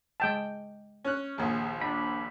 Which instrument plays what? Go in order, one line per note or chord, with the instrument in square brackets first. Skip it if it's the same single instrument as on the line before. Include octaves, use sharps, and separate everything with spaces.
[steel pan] G#3 G5 A5
[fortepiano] C#4 F#6
[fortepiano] A#1 D#2 [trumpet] G#4
[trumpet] D4 [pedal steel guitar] B5